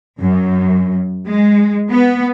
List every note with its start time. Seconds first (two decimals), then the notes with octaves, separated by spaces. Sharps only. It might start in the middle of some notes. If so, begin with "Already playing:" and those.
0.19 F#2
1.27 G#3
1.89 B3